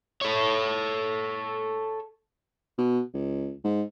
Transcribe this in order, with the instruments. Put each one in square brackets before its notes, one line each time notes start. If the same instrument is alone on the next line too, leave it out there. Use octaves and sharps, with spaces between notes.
[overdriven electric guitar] A4 C#5
[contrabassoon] B2
C#2
G#2